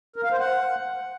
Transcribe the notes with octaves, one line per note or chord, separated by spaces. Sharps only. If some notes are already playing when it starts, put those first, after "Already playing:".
A#4
F5
C5
F#5